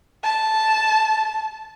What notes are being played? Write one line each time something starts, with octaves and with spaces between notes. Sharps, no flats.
A5